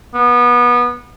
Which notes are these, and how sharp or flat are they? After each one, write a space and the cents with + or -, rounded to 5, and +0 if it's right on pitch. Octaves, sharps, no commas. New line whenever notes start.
B3 -25